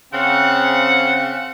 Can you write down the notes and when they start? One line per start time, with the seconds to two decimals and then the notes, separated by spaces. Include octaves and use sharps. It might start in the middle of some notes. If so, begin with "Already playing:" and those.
0.14 C#3 C4 F#5